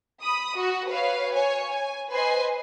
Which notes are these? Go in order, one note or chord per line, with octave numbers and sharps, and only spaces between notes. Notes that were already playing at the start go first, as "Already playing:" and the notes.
B5 D#6
F#4
B4 C#5 F5
C#5 G#5
G#5
B4 C5 D#5 G#5 C7